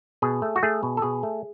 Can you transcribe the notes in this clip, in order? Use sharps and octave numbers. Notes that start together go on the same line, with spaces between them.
B2 G#4
A3
F#4
A3 G#4
B2
A4
B2 G#4
A3